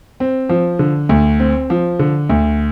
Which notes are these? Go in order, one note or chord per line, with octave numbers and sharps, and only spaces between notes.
C4
F3
D3
D2
C4
F3
D3
D2